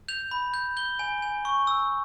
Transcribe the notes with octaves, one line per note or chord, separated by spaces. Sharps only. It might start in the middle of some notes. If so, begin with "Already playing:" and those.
G6 F7
B5
G6
G6 G7
G#5
G#5
C#6
E6